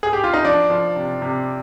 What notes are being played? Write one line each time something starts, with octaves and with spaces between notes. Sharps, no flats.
G#4
G4
F4
D#4
F3 D4
F3
C3
C3